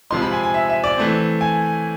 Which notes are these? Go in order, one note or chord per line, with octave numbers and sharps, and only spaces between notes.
C3 F3 G#3 C6
B5
G#5
G#5
E5
E5
D5
E3 A3 C4
G#5